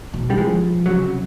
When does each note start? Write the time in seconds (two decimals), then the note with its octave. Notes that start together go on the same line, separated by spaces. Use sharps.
0.14 B2
0.30 G3
0.37 F3 G#3
0.86 C#3 F#3
1.02 C3